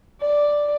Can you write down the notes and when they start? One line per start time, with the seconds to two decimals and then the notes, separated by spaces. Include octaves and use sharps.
0.21 D5